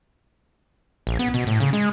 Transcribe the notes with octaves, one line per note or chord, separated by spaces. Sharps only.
A#1
B3
B2
A2
C#3
G#3